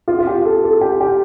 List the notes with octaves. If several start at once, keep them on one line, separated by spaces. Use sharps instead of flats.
F4
F4
G4
A4
A4
G4
G4